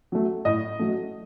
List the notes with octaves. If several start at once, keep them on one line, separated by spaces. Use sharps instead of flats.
F#3 A3
A2 D#5
F#3 A3